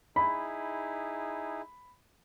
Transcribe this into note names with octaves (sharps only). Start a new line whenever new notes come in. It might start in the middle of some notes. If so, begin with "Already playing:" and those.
D#4 E4 G#4 B5